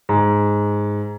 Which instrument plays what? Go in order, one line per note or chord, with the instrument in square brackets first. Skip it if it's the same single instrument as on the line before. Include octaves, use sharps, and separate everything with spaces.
[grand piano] G#2